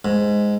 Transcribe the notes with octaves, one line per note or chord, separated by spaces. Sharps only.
G#2